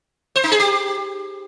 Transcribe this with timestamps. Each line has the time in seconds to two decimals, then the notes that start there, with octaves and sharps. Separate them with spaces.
0.36 C5
0.44 D#4
0.52 G#4
0.60 G4